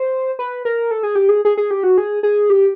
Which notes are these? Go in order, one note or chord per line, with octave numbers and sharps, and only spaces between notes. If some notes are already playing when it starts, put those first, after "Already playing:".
Already playing: C5
B4
A#4
A4
G#4
G4
G#4
G#4
G#4
G4
F#4
G#4
G#4
G4